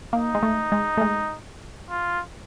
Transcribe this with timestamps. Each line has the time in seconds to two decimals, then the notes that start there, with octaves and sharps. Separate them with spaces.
0.13 A#3 D#4
0.35 G#3
0.43 A3
0.72 G#3
0.97 A3
1.01 G#3
1.90 F4